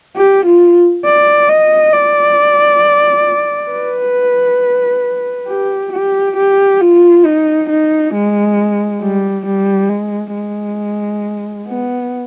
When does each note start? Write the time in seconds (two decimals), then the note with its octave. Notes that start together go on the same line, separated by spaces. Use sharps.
0.16 G4
0.45 F4
1.05 D5
1.49 D#5
1.93 D5
3.70 B4
5.47 G4
5.92 G4
6.36 G4
6.81 F4
7.25 D#4
7.69 D#4
8.14 G#3
9.02 G3
9.46 G3
9.90 G#3
10.34 G#3
11.67 B3